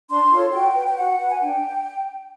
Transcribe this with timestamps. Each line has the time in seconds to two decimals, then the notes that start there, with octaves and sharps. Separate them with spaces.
0.10 D4 C6
0.31 F4 A4 C#5
0.53 F#4 G5
0.75 B4
0.87 G5
0.97 F#4 F#5
1.19 B4
1.30 G#5
1.40 D4 G5